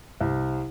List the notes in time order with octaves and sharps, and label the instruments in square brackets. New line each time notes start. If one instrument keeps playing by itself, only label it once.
[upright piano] C2